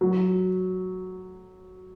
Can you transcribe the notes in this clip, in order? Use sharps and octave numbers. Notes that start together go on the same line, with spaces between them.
F#3